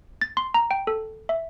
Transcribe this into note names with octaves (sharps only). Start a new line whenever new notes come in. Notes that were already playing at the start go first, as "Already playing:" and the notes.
A6
C6
A#5
G5
A4
E5